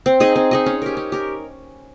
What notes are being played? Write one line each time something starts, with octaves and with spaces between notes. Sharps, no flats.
C4
D#4 G#4 D#5
C4
D#4 G#4 D#5
C#4
G4 A#4
C#4
G4 A#4